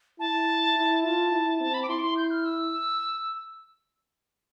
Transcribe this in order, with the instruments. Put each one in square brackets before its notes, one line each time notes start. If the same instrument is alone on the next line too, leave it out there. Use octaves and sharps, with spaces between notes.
[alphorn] E4 [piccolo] A5
[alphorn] E4
[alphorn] F4 [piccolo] A5
[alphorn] E4
[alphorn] C4 [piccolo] A5
[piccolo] B5
D6
[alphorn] E4 [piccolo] C6
[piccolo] D6
C6
G6
F6
E6